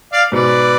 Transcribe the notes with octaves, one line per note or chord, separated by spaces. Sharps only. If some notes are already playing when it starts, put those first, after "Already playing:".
D5 F5
G#2 B2 B4 D5